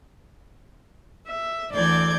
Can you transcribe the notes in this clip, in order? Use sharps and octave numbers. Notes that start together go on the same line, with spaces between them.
E5
D2 E3 D5 G6 G#6